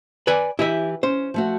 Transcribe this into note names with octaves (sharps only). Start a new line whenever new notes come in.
B4 D5 G#5
E3 E4 G4 D#5 E5
C#4 C5
F3 A3 F#4